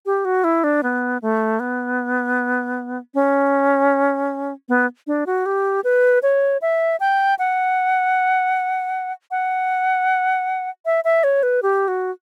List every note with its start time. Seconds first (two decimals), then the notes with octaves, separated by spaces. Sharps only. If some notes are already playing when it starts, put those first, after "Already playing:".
0.06 G4
0.25 F#4
0.44 E4
0.64 D4
0.83 B3
1.22 A3
1.60 B3
3.14 C#4
4.69 B3
5.07 D4
5.26 F#4
5.46 G4
5.84 B4
6.23 C#5
6.62 E5
7.00 G5
7.39 F#5
9.31 F#5
10.86 E5
11.04 E5
11.24 C#5
11.43 B4
11.63 G4
11.88 F#4